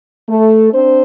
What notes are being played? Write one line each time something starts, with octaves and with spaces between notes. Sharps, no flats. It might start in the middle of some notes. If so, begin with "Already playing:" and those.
A3 A4
C4 D4 C5